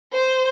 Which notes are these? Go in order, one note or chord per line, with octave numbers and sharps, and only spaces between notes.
C5